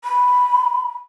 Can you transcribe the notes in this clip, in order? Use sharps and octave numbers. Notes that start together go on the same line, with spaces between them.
B5